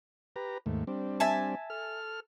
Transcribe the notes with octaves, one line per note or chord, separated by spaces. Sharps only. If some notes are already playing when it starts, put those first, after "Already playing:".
G4 B4 A#5
D#2 G#2 A3
G3 C4 D4
E5 G#5 A5
A4 F6